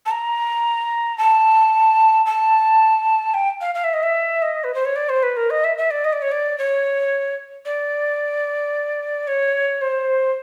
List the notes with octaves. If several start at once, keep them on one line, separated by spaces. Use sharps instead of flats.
A5
A#5
A5
A5
G5
F5
F5
E5
D#5
E5
D#5
B4
C5
C#5
D5
C5
B4
A#4
D#5
E5
E5
D5
D#5
D5
C#5
D5
C#5
D5
C#5
C5